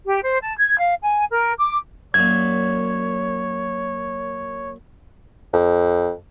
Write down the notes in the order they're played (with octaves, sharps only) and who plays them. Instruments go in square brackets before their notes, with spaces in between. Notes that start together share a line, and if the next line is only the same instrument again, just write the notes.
[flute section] G4
C5
A5
G#6
F5
G#5
A#4
D6
[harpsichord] F#2 A#2 [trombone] C#5 [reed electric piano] G#6
[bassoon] F2